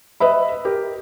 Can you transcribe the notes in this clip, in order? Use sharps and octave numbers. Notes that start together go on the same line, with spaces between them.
B4 D#5 E5 B5
G4 A#4